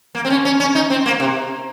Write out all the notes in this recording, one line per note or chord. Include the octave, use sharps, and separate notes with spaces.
A#3
C4
C#4
C#4
C#4
D#4
C4
A#3
C3